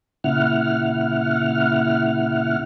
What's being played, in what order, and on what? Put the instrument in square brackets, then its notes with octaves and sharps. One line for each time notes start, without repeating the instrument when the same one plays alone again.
[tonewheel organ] A#2 C#3 E4 F#5 F6